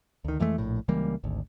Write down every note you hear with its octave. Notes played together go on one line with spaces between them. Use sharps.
D2 D#3
F2 E3 G#3 A3
A#1 A2
C#2 E3 G3 A#3
G#1 D2